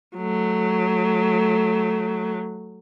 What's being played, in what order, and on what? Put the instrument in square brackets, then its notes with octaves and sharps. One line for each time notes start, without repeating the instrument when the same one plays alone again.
[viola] F#3 A3